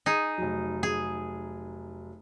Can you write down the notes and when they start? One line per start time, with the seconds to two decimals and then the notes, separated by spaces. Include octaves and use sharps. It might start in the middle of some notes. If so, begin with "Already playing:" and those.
0.06 D#4 G#4
0.38 F1 F#3
0.83 G#4